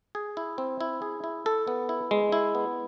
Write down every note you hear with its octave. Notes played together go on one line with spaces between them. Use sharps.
G#4
E4
C4
E4
G#4
E4
A4
B3
E4
G#3
E4
B3